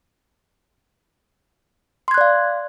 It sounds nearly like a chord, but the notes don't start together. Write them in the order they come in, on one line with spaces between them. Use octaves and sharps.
C6 G#6 F#6 D5 F5